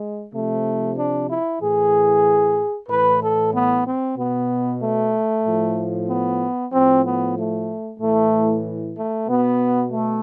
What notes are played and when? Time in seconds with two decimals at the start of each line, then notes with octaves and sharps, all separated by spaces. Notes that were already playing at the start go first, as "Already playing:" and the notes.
Already playing: G#3
0.33 C3 F3 A3
0.97 D4
1.29 E4
1.61 A2 E3 G#4
2.89 A2 E3 B4
3.21 A4
3.53 B3
3.85 C4
4.17 B2 B3
4.81 A3
5.44 A2 F3
6.08 B3
6.73 A2 F3 C4
7.05 B3
7.36 A3
8.00 A2 E3 A3
8.96 A3
9.28 B2 B3
9.92 A3